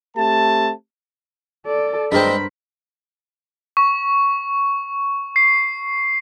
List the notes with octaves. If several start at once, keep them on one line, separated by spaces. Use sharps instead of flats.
A3 C4 G4 A5
A4 D5
G2 G#3 C4 A#4 C5 B5
C#6
C7